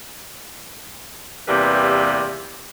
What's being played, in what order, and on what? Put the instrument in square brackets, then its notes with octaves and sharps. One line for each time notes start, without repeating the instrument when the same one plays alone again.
[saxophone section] E2 C3 E3 G3 A#3 B4